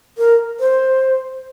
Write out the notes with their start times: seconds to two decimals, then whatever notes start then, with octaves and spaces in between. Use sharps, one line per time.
0.18 A#4
0.60 C5